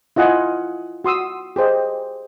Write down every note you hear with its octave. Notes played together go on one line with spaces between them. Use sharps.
E4 F4 D#5 F#5 G#5
F#4 C6 D#6 E6
G4 G#4 C5 D#5